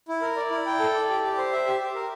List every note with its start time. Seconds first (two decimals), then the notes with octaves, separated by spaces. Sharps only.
0.08 E4
0.22 A#4
0.36 D5
0.50 E4
0.66 G5
0.79 A4
0.94 D5
1.09 G4
1.23 G4
1.37 C5
1.53 E5
1.66 G4
1.80 G4
1.95 A#4